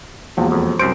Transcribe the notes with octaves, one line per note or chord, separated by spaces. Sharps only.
E1 A#1 E2 F3
F2
C2 F#2 C5 D7